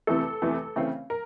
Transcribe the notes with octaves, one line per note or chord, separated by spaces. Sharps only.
E2 C3 E3 A3 A4
E2 C3 E3 A3
C#3 E3 A3 C4
A#4